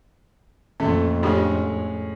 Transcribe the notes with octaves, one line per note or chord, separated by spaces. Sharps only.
F2 A#2 A3 C#4
A2 G#3 C#4 D4 G4